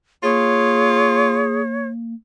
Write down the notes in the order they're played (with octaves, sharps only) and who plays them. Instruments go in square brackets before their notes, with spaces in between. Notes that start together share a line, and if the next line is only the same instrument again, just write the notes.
[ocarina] A#3 [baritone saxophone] F4 [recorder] G#4 [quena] C#5